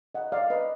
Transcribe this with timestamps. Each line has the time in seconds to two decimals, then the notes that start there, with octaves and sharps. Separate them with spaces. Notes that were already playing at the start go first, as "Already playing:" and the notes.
0.15 D#5 F#5
0.32 D5 F5
0.50 B4 D#5